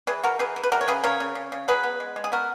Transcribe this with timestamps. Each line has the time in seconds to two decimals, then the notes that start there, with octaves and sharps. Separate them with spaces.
0.07 E3 G#4 B4
0.23 E3 F#4 A#4
0.39 E3 G#4 B4
0.56 E3
0.63 B4
0.72 E3 F#4 A#4
0.81 C#5
0.88 C#3 G#4 B4
1.04 C#3 A#4 C#5
1.20 C#3
1.35 C#3
1.52 C#3
1.68 F#3 G#4 B4
1.83 B3
2.00 G#3
2.16 G#3
2.24 G#4
2.32 B3 F#4 A#4